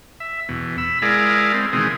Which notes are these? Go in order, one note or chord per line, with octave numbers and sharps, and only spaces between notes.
E5
E2 B2
B5 E6
G#3 E4 G#4 A#4 D5 F5
G#3 C4
B2 D#3 E3 G#3 C4 G#4